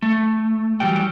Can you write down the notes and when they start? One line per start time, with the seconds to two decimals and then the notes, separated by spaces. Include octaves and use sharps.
0.02 A3
0.80 E3 F#3 G3 G5